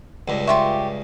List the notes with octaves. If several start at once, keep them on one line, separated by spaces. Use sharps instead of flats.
C#2 G2
F4 G4 E5 C6 C#6